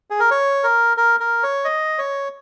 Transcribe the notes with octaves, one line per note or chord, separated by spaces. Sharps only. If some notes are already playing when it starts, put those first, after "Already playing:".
G#4
A#4
C#5
A#4
A#4
A#4
C#5
D#5
C#5